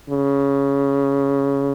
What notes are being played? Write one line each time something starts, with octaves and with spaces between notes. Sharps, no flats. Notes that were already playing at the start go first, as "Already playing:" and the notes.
C#3